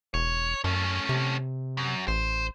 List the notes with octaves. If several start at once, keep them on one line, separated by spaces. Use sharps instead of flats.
E1 C#5
F#2 A3 C#4
C3
F#2
A1 C5